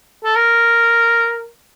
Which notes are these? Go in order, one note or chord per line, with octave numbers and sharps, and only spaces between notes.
A4
A#4